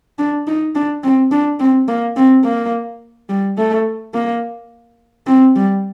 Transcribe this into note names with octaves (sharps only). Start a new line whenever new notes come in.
D4
D#4
D4
C4
D4
C4
A#3
C4
A#3
G3
A3
A#3
C4
G3